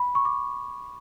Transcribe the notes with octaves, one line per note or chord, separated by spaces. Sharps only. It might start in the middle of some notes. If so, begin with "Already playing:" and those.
Already playing: B5
C#6
D6